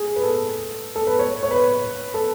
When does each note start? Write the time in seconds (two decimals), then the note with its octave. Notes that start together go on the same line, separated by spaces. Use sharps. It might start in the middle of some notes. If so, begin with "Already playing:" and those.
Already playing: G#4
0.16 B4
0.23 A4
0.96 A4
1.07 B4
1.19 C#5
1.43 C#5
1.51 B4
2.14 A4